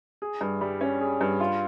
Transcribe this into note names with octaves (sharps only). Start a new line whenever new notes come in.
G#4
G2
G3
C#4
G#4
G2
F4